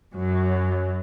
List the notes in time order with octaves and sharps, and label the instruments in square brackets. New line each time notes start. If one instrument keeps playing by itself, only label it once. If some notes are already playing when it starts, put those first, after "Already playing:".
[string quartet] F#2 F#3